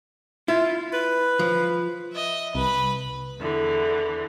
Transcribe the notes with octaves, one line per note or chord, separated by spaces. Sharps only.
E4 F4
B4
F3
D#5 E5
C2 B4 B5
E2 D3 E3